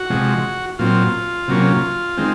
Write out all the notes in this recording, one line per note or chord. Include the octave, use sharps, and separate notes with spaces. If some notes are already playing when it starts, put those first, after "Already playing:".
Already playing: F#4
C3 F3 G#3
A#2 F#3 C4 F4
C3 F#3 A#3 C#4
D#3 G#3 C4